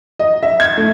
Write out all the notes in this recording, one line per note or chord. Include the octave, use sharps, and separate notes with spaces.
D#5
E5
G#6
A3